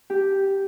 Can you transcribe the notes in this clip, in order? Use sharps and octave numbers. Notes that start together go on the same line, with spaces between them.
G4